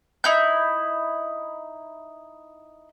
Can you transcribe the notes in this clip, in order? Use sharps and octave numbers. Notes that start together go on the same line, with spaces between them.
D#4 E4 G6